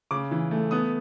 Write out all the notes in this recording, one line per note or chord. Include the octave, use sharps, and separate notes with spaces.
C#3 D6
E3
A3
B3 D#6